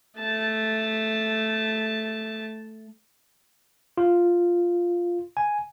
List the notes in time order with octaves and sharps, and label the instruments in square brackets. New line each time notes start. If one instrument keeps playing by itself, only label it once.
[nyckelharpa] A3 A5
[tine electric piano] F4
G#5